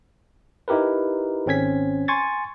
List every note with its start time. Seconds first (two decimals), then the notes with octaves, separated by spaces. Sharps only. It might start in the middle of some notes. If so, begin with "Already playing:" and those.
0.68 D#4 E4 G4 A#4 B4
1.46 G#1 C4 C#4 G#6 B6
2.08 G#5 C6 C#6 G#6 A6